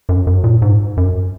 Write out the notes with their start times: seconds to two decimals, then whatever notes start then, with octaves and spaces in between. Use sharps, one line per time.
0.09 F#2
0.27 F#2
0.44 A#2
0.62 G#2
0.97 F#2